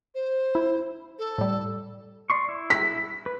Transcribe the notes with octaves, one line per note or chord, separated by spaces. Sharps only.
C5
E4
A4
A2 G3
D5 C6 C#6
E4
B6
B4